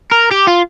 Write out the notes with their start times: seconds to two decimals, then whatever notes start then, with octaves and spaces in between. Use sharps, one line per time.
0.11 A#4
0.31 G4
0.48 F4